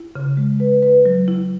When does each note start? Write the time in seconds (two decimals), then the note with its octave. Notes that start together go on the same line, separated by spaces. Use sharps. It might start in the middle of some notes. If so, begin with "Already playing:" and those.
Already playing: E4
0.16 C#3
0.37 G#3
0.60 B4
0.83 B4
1.06 F#3
1.28 E4